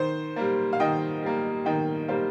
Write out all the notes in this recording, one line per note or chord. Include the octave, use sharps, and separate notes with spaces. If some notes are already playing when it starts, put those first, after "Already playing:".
Already playing: D#3 C5
G3 A#3
F5
D#3 D#5 G5
G3 A#3
D#3 D#5 G5
G3 A#3 C5 F5